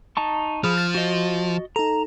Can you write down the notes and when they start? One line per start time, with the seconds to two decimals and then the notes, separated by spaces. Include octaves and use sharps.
0.17 D#4 A5 C#6
0.64 F3 G#4 B5 D#6 F6
0.77 A6
0.95 F#4 D#5
1.76 D#4 A4 A#5